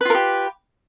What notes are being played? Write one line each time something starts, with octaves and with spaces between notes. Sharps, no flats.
F4 G4 A#4 B4